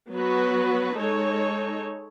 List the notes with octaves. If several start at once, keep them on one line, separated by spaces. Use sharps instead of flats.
F#3 B3 F#4 B4
G#3 D#4 A4 C#5